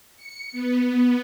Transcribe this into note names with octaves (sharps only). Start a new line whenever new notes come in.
C#7
B3